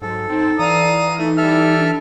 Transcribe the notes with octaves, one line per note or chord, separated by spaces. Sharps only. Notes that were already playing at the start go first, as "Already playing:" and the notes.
G#2 F#3 A4
C4 D#4
E3 D5 F5 A#5 D#6
A3 D#4
G3 A4 E5 F6
D4